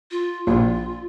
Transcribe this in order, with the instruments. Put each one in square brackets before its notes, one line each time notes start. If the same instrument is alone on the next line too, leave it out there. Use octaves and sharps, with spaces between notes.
[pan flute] F4
[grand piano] A#1 A#2 [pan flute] F4